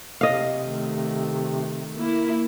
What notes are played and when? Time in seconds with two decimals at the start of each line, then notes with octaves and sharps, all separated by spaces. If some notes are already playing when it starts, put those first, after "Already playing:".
0.21 C3 D#5 F5
0.65 D#3 A3
1.98 A#3 E4